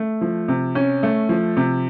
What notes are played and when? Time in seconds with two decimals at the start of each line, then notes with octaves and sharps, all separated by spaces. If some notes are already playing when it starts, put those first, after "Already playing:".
Already playing: A3
0.21 F3
0.48 C3
0.75 C#4
1.03 A3
1.29 F3
1.57 C3